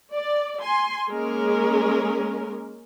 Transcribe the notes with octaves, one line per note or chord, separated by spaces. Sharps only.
D5
G#5 C6
G#3 A#3 C#4 G#4 A#4